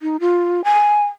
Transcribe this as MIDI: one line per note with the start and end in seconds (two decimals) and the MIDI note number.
0.02 0.17 63
0.20 0.62 65
0.64 1.04 80